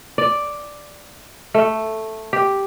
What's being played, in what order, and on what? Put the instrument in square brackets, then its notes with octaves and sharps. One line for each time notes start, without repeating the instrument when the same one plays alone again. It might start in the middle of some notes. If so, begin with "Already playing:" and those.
[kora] D5
A3
G4